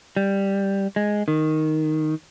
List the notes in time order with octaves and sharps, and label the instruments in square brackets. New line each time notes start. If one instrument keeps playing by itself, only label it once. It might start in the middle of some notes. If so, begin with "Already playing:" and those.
[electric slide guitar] G3
G#3
D#3